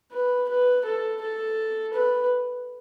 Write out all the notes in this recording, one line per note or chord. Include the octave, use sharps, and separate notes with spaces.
B4
B4
A4
A4
B4